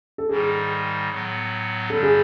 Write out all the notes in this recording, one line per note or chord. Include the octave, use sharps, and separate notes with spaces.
A4
G#2 D#3 G3 G#4
A2 F#3 B3
G2 D3 G3 A4
G#4